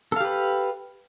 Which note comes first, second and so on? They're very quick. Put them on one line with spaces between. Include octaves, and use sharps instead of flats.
A4 F5 G4 B4